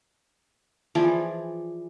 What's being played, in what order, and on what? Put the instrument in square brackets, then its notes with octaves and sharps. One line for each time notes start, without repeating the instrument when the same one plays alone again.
[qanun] E3 F3 G#4 D5